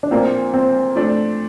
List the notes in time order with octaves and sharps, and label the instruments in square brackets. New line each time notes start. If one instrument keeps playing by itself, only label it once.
[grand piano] D4
[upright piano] A#2 F3 A#3 F4 [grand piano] C4
[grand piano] C4
[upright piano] F3 A3 D4